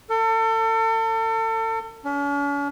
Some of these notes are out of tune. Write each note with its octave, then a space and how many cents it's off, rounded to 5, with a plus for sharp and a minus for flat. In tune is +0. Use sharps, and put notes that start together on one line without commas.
A4 +35
C#4 +45